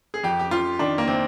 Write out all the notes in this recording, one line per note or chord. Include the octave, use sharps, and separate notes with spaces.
G#4
F2 G4
G4
F2 F4
D#3 D4
A#3
C3 C4